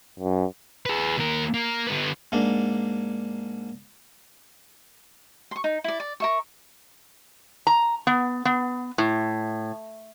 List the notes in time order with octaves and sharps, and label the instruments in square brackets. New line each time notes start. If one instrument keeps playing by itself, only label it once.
[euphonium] F#2
[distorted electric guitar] G#4 B4
D#2 A#4
A#3
D3 B3
[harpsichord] G#2 A#3 D4
[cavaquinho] C6 C#6
D#4
E4 D5
D5
A#4 E5 C#6
[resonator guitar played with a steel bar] A#5
B3
B3
A2